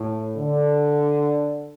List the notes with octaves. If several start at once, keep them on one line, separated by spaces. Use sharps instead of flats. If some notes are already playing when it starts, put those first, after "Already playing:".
Already playing: A2
D3